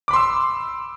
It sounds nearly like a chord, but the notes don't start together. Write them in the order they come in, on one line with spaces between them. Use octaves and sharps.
D6 B5 C6 E6